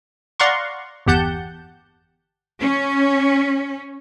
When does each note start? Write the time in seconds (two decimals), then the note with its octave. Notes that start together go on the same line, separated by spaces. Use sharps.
0.40 D5 F5 F#5 A#5 C6 C#6
1.07 G1 E2 G4 F#5 A5 G6
2.60 C#4